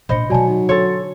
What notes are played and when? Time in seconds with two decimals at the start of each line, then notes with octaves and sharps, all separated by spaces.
0.09 A#2 D4 C5 D#5 B5 C#7
0.30 B2 D#3 F#3 D5 G#5 A5
0.48 D#4
0.69 D3 A4 C#5 C6 A6